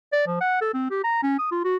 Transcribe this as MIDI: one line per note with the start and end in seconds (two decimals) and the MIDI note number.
0.13 0.24 74
0.27 0.37 53
0.41 0.57 78
0.61 0.69 69
0.74 0.86 60
0.91 1.03 67
1.04 1.18 82
1.23 1.38 61
1.39 1.50 87
1.51 1.62 65
1.65 1.77 66